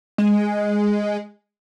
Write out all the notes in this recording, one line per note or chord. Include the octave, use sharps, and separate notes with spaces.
G#3